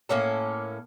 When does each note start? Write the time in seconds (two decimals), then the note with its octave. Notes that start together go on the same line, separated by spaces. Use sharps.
0.09 A2 A#3 C#4 A4